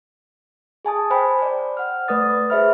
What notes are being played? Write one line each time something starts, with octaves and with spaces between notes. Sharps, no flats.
G#4 G#5 A5 D#6
C5 G5 G#5 B5
C5 D5
F#5 F6
A3 B4 D5 D#6 A6
G#4 B4 C5 E5 B5 F6